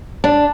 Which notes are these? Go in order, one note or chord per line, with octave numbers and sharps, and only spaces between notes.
D4